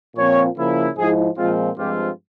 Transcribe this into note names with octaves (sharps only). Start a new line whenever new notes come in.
A#2 F3 C4 F4 C#5
C#3 F3 A#3 E4
G#2 F3 G#3 E4 G#4
A#2 F3 G#3 C4 F4
G2 F3 G#3 C4 F4 G4